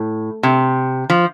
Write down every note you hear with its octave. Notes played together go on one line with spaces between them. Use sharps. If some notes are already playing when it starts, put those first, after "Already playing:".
Already playing: A2
C3
F3